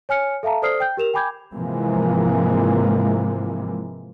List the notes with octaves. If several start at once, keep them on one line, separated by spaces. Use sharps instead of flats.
C#5 G#5 F6 C#7
A4 E5 F5 A5 A#5
A4 C5 D5 D#6 F6 C7
G5 G6
G4 A#4 E7 F7
G5 G#5 B5 D6 G6 G#6
G#2 C3 E3 F3 G#3 A#3